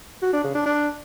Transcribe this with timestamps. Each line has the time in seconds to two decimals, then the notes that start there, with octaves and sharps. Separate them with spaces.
0.22 F#4
0.33 D4
0.44 C#3
0.55 D4
0.66 D4